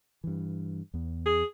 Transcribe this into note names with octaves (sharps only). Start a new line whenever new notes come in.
G2 E3
E2 B3
G#4